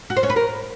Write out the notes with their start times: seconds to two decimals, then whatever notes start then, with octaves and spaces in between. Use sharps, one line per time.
0.10 F#4
0.17 C5
0.23 C#4
0.30 B4
0.36 A#4